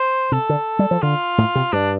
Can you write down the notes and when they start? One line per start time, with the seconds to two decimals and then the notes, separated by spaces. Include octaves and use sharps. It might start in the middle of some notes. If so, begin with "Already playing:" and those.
Already playing: C5
0.32 C3 A4
0.49 D3
0.79 G3
0.91 F3
1.02 D3 F4
1.38 A2
1.55 C3
1.72 G2 D4